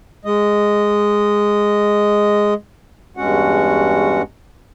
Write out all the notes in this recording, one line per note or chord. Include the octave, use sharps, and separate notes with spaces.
G#3 D#5
E2 G2 G#3 C#4 F#4 F#5